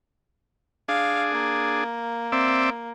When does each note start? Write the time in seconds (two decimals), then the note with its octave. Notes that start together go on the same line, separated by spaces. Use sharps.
0.88 D4 G#4 F5
1.31 A#3
2.32 C4 D5 E5